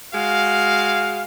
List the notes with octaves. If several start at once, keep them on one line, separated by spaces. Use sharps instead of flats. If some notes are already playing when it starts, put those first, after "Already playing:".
G#3 F#4 F5